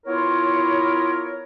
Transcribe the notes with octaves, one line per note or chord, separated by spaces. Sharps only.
B3 E4 F4 A#4 C#5